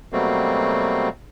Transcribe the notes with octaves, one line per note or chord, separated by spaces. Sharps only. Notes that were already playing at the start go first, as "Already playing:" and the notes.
B2 F#3 G3 A3 A#3 C4